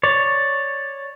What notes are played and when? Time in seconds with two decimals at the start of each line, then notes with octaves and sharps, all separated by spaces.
0.03 C#5 D5